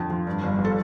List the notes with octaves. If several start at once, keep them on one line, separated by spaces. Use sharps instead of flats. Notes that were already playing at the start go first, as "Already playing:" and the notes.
Already playing: F2 D3
F3
G2
G1
F3
A4